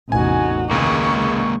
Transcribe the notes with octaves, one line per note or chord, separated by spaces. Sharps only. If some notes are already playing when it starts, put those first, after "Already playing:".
A1 E2 C3 D#4 F#4 G#5
C#2 C3 D#3 G#3 A#3 G#4 C#6